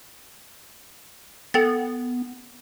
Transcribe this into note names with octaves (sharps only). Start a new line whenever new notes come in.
B3 A4 G5 A6